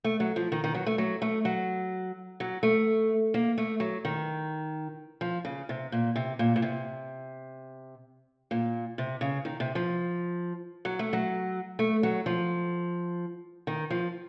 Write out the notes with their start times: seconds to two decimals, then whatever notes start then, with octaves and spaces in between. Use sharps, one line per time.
0.04 A3
0.20 F#3
0.36 F3
0.52 D#3
0.64 D#3
0.75 F#3
0.86 A3
0.98 F#3
1.22 A3
1.45 F#3
2.40 F#3
2.63 A3
3.34 A#3
3.58 A3
3.80 F#3
4.05 D#3
5.21 F3
5.45 C#3
5.69 C3
5.92 A#2
6.16 C3
6.39 A#2
6.56 A#2
6.62 C3
8.51 A#2
8.98 C3
9.21 C#3
9.45 D#3
9.60 C3
9.75 F3
10.85 F#3
10.99 A3
11.13 F#3
11.79 A3
12.03 F#3
12.26 F3
13.67 D#3
13.90 F3